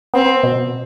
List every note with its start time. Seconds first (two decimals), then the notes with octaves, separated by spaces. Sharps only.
0.14 B3 C4
0.43 B2